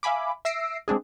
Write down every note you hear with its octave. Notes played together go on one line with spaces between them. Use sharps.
E5 F5 G#5 B5 D6
E5 E6 A#6 C7 D7
G#3 C4 D4 G#4